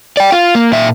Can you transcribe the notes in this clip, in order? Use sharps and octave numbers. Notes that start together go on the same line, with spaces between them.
D5 G5
F4
A#3
A#2 E5